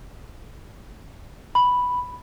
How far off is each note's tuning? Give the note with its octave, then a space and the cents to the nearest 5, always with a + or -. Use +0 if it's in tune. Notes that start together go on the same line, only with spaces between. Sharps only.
B5 +0